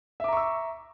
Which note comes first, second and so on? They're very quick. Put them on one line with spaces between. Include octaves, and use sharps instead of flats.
E5 D6 A#5 C#6 E6